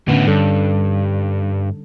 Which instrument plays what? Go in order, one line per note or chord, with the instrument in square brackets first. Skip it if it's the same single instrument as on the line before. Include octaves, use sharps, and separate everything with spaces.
[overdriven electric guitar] A2 B3 [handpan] D3 C#4
[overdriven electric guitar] G2 [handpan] D3 G3 A4